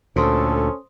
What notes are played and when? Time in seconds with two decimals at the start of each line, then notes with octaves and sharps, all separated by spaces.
0.16 D2 A#2 C#4 A4 C5 C6 D#6